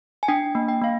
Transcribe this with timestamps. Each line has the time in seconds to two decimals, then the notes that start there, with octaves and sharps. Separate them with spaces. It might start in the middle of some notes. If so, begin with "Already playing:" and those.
0.23 G#5
0.28 D4 G5
0.55 A#3
0.68 G5
0.82 A#3 F5